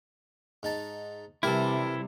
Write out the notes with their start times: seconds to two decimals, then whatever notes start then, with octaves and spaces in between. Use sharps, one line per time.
0.63 G#2 D#4 A5
1.43 C3 E3 G3 E4 G4 A4 A#4